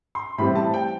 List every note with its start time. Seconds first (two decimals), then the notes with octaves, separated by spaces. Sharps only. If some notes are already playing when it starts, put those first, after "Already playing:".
0.15 C6
0.38 A2 E3 G3 C4 B5
0.55 A5
0.74 G5